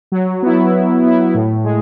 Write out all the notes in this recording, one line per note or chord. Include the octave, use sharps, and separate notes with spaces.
F#3
B3 E4
F#3
B3 E4
A2
G#3